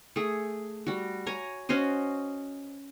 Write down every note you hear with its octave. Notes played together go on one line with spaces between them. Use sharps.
A3 G#4
G3 F#4
C#5 G#5 A#5
C#4 F#4 C5 D#5